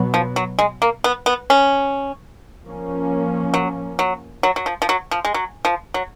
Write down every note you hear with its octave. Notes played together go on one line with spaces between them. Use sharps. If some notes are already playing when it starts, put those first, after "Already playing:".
Already playing: B2 F#3 B3
F3
F#3
G#3
A#3
B3
B3
C#4
F3 A#3 C#4
F#3
F#3
F#3
F#3
F3
F3
F#3
F3
G#3
F#3
F3
F#3